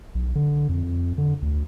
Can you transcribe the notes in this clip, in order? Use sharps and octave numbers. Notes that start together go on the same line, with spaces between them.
B1
D3
F2
D3
D2